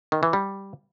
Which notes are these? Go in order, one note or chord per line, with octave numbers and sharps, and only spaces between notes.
D#3
E3
G3